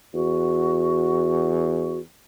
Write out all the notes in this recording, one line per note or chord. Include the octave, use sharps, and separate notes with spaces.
E2 F#4